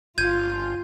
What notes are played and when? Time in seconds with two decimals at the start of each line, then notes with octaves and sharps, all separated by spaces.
0.18 G1 F4 G6 G#6 D#7